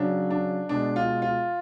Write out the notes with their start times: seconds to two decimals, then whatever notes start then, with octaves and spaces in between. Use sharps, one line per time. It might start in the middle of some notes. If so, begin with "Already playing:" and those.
Already playing: C#3 F#3 D4
0.30 D4
0.69 B2 G#3 D4
0.96 F4
1.22 F4